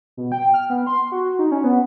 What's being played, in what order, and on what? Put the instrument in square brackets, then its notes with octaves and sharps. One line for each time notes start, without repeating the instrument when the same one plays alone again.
[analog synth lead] B2
G5
F6
B3
C6
F#4
D#4
C#4
B3